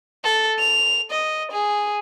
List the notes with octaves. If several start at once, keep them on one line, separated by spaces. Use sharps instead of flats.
A4
F7
D#5
G#4